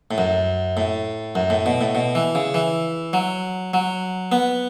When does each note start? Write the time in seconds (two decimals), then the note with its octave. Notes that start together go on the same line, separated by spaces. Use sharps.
0.11 A2
0.18 F#2
0.77 A2
1.35 F#2
1.50 A2
1.66 B2
1.81 A2
1.95 B2
2.15 E3
2.35 C#3
2.54 E3
3.13 F#3
3.74 F#3
4.32 B3